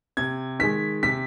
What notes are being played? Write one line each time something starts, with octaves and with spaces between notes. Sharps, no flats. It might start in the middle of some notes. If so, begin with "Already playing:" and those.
C3 G#6
D#3 G#3 B6
C3 B6